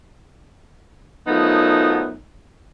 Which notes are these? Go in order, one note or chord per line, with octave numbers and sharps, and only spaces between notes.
F#2 F3 F#3 A3 B3 D#4